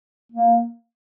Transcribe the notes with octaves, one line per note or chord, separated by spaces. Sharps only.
A#3